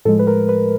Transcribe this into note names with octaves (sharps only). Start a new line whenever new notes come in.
A2 F3 G#3 A4
B4
A#4
B4